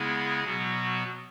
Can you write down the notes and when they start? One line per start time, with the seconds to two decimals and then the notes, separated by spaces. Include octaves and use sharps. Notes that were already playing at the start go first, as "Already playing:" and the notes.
Already playing: C#3 G#3 B3 E4 G#4
0.44 B2 F#3 B3 F#4